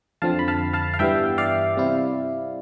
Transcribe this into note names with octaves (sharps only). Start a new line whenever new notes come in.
F2 D3 F3 C4 F5 A5
B5
F5 A5
F5 A5
F5
G2 E3 G3 B3 E5 G5
D5 F5
C3 G3 C4 E4